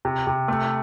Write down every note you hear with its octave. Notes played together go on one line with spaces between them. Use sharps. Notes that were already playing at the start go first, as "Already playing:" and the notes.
C3
C3
A3